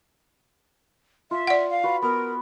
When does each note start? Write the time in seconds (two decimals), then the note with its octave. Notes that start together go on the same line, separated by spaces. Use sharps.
1.31 F4 E5
1.47 D5 F#5
1.70 F5
1.84 F#4 B4
2.02 B3 A#4